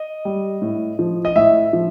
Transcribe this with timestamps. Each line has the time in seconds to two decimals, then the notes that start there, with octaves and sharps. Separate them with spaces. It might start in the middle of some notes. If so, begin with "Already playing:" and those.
Already playing: D#5
0.25 G3
0.62 A2
0.99 F3
1.25 D#5
1.36 A2 E5
1.73 F3